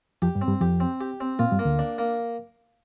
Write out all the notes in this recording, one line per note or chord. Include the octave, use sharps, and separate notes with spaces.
F2 F3 G4
G2 G3
C4
G2 G3
F2 F3 G4
C4
G4
C4
A#2 A#3 F4
G2 G3
A#3
D2 D3
D4
A#3